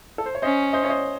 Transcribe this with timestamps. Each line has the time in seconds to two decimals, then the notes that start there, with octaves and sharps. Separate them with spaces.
0.18 A4
0.26 C5
0.35 C#5
0.42 C#4 C5 D#5
0.73 C5 D#5
0.85 C#5
0.90 C5 D#5